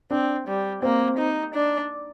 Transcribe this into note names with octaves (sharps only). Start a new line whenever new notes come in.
C4 D4
G3
A#3 C4
D#4
D4